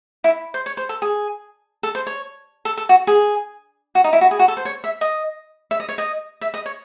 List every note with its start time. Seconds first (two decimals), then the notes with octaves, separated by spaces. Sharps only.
0.24 E4
0.54 C5
0.66 C#5
0.77 C5
0.89 A4
1.02 G#4
1.83 A4
1.95 C5
2.07 C#5
2.65 A4
2.77 A4
2.89 F#4
3.07 G#4
3.95 F#4
4.04 D#4
4.13 E4
4.21 F#4
4.31 G#4
4.39 F#4
4.48 A4
4.57 C5
4.65 C#5
4.84 E5
5.01 D#5
5.71 E5
5.80 D#5
5.89 C#5
5.98 D#5
6.41 E5
6.54 D#5
6.66 C#5